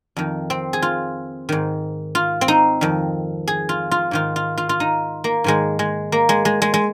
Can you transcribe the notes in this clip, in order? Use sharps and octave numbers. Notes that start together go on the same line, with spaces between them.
F2 D#3
C4
G#4
F4
G#2 D#3
F4
C4
D#4
F2 D#3
G#4
F4
F4
G#2 D#3 F4
F4
F4
F4
D#4
A#3
G#2 D#3 G#3
G#3
A#3
G#3
G#3
G#3
G#3